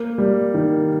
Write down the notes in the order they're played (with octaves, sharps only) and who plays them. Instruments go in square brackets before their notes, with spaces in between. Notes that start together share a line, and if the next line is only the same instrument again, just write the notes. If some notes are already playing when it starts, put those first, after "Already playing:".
Already playing: [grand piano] A#3
G3
D#3